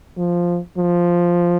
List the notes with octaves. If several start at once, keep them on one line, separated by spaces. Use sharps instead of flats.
F3
F3